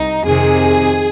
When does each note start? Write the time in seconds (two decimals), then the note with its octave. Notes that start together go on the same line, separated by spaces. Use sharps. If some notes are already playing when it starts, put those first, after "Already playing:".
Already playing: C2 D#4
0.25 F2 C3 D#3 G#4